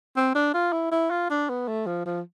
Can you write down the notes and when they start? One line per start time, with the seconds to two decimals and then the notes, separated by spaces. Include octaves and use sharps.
0.16 C4
0.35 D4
0.54 F4
0.72 E4
0.91 E4
1.10 F4
1.30 D4
1.49 B3
1.68 A3
1.86 F3
2.05 F3